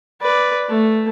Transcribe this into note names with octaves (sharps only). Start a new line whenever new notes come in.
B4 D5
A3